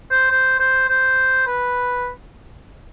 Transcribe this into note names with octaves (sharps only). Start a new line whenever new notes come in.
C5
C5
C5
C5
B4